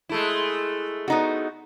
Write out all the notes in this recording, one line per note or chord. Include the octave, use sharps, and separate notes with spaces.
G#3 A3 E4
B3 D#4 F#4